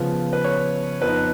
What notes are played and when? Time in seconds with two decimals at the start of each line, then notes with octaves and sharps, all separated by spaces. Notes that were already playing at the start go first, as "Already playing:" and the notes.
Already playing: C#3 F3 B3
0.33 B4
0.44 C#5
1.01 F2 F3 B3 D#4 B4